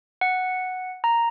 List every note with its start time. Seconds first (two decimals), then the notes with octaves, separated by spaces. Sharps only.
0.21 F#5
1.04 A#5